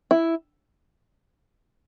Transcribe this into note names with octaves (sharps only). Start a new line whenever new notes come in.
E4